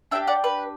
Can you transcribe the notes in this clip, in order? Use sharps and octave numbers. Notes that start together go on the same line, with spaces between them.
D4 G4 E5 G5
D5 F#5
B4